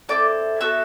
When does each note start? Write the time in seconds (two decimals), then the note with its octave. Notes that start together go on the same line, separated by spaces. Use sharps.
0.09 C4 E4 A4 D5 D6
0.61 B3 F#4 A4 E5 E6